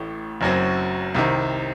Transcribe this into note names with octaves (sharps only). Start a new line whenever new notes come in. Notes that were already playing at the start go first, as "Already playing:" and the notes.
Already playing: A1 A2 A3
F#1 F#2 F#3 C4 F#4
C2 C3 D#3